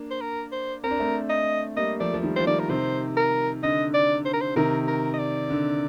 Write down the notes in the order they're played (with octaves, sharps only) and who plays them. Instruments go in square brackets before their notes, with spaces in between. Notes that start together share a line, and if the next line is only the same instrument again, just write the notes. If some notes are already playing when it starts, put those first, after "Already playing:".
Already playing: [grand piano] A#3 D4
[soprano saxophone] C5
A#4
C5
[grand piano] C4 [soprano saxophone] A#4
[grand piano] D4
A3 C4
[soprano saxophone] D#5
[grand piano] G3 A#3 [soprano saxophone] D#5
[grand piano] F3 A3 [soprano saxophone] D5
[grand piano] F3
D#3 G3
[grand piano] F3 [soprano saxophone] C5
[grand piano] D#3 G3 [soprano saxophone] D5
[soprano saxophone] A#4
[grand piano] C3 D#3 [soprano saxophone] C5
[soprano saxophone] A#4
[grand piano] D3 [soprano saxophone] D#5
[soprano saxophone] D5
C5
A#4
C5
[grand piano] C3 D#3 [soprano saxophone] A#4
[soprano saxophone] A#4
D#5
D5
[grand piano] D3